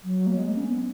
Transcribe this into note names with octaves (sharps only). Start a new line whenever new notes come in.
F#3
A#3
G#3
A#3
C#4
B3